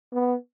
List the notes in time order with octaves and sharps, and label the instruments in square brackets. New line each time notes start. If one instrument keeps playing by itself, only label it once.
[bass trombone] B3